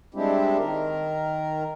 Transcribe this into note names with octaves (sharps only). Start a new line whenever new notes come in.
G3 G#3 C4 D4 E4 G4
D#3 A#4